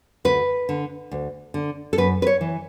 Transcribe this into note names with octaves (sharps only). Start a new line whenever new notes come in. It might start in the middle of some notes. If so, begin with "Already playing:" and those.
D2 B4
D3
D2
D3
A4
F#2 B4
B4
C#5
E3